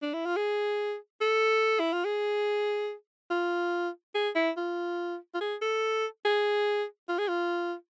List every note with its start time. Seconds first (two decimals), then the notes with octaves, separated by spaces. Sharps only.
0.02 D4
0.14 E4
0.26 F4
0.36 G#4
1.21 A4
1.80 E4
1.93 F4
2.05 G#4
3.30 F4
4.15 G#4
4.36 E4
4.57 F4
5.34 F4
5.41 G#4
5.62 A4
6.25 G#4
7.08 F4
7.18 G#4
7.28 F4